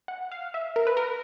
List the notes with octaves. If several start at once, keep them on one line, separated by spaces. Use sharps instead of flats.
F#5
F5
E5
A#4
B4
A#4